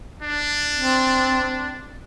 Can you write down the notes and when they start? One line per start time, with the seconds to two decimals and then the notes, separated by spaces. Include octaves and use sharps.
0.23 D4
0.76 C4